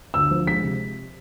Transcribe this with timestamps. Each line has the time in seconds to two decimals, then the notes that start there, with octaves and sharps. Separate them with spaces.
0.14 D2 E6
0.31 F3
0.47 G#3 B6
0.63 C3